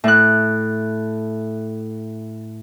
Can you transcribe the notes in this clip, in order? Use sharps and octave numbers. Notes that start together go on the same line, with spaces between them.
A2 F#6